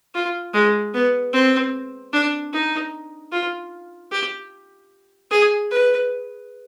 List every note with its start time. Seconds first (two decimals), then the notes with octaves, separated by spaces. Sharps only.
0.15 F4
0.54 G#3
0.94 B3
1.34 C4
2.13 D4
2.53 D#4
3.32 F4
4.12 G4
5.31 G#4
5.71 B4